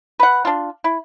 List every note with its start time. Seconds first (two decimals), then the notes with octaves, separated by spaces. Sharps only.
0.20 B4 F#5
0.45 D4 F4
0.84 E4